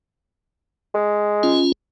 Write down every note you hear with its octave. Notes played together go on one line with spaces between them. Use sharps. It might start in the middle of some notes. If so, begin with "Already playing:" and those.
G#3
C#4 F4